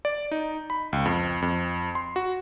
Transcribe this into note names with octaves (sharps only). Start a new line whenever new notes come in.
D5
D#4
B5
C#2
F2
F2
C6
F#4